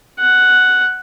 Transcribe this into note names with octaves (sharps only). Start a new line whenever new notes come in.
F#5